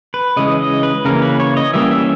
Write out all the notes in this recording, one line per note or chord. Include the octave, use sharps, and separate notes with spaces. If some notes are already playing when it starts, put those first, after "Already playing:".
B4
C#3 E3 G#3 D#5
D#5
B4
C#3 E3 A#3 C#4 A#4
B4
C#5
D#5
E3 G3 A#3 C#4 E5
E5